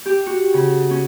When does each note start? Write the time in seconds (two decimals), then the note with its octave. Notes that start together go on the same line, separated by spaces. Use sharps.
0.06 G4
0.26 F#4
0.54 C#3
0.91 C#4